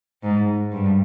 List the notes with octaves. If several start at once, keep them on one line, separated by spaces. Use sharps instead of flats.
G#2
G2